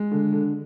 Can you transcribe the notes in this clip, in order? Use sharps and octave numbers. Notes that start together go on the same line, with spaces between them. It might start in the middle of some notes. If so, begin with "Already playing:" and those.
Already playing: G#3
D3
D3